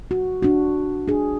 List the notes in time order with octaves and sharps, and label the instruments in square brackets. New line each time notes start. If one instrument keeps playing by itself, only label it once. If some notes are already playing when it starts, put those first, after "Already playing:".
[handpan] F#4
D4 F#4
D4 G#4